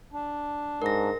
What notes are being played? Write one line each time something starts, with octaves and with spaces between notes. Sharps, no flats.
D4
G#2 A#4 A#6